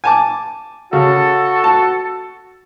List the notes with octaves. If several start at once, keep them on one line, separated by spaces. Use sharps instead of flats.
G#5 A5 D6
C#3 F#4 A4
A5